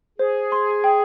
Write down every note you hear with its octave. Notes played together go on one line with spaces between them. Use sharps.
G#4 C5
C6
G5